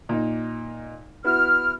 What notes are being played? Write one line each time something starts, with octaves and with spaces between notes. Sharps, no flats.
A#2 D#4
B3 E4 F#4 F6